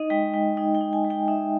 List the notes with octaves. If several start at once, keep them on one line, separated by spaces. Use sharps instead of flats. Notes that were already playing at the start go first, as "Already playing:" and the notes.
Already playing: D#4 D#5
G#3 G5
G#3 G5
D#4 G5
G5
D#4
G#5
G#3
G5
D#4 E5